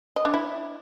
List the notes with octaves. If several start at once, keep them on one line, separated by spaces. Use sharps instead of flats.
D#5
D4
E4